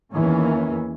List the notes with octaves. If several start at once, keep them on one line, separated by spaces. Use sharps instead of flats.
E2 D#3 E3 A#3 C#4